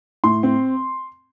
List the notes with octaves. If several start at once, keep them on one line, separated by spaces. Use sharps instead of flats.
A2 C6
C4